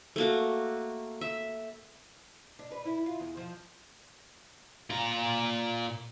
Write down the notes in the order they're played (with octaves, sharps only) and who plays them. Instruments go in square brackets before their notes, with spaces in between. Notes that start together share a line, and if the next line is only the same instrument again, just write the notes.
[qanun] A3 A#3 F#4
E5
[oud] D4
B4
E4
F4
E2
F3
[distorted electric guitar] A#2 A#5